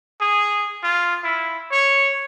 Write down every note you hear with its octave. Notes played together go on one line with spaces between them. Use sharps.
G#4
F4
E4
C#5